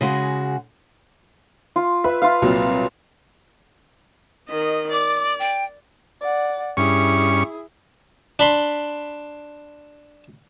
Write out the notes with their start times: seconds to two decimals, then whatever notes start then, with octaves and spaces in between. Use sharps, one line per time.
0.01 C#3 G#3 F#4
1.76 F4
2.04 B4 E5
2.22 F4 F5
2.42 C2 A#2 F#3
4.49 D#3 D#5
4.93 D5 D6
5.39 G5
6.21 D5 F#5
6.77 G2 C#4 E4 G#4 C#6
8.39 D4 B5 C6